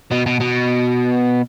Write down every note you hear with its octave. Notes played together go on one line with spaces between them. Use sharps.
B2
B2
B2